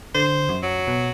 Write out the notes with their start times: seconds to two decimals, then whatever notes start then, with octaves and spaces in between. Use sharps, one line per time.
0.15 D3 C5
0.49 F#2
0.63 F#3
0.88 B2